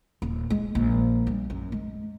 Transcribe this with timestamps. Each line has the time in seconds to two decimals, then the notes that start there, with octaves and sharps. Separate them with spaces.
0.22 D#1
0.50 G#3
0.75 A#1
1.27 G3
1.50 F#2
1.72 G#3